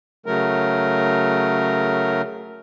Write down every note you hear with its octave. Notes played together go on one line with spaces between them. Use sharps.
C#3 F#3 A3 A#4